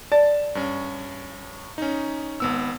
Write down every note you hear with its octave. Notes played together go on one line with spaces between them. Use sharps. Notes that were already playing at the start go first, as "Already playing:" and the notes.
D5 A5 A6
G2 C#4
C#4 D#4
G#1 B3 E6